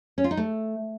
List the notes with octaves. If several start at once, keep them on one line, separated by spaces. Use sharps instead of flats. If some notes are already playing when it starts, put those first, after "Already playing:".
C#4
F4
D#4
A3